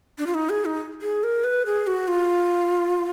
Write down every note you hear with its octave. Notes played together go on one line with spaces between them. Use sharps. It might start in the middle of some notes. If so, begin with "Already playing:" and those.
D4
F4
D#4
G#4
D#4
G#4
A#4
B4
G#4
F#4
F4